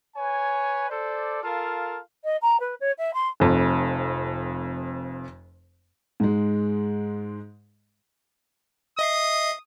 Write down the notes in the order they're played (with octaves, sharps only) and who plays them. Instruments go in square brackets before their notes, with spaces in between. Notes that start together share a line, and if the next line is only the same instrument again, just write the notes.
[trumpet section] B4 C#5 G#5
A4 C5 D5
F4 A4 A#4 F5 A5
[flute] D#5
A#5
B4
C#5
E5
C6
[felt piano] F1 F2
[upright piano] G#2 G#3
[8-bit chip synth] D#5 E5 C7 [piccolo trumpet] D#6